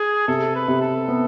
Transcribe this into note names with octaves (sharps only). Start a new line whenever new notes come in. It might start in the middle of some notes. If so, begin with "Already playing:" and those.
Already playing: G#4
C3 A4
B4
C3
A4
B3